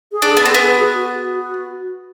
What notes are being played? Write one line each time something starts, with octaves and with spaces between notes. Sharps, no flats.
G#4
D4
A4
B3
C4
B3 G#4
F#4
F#4